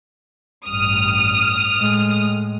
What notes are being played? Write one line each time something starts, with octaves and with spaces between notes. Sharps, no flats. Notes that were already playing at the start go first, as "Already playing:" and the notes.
A1 G2 D#6 F6
A2 G#3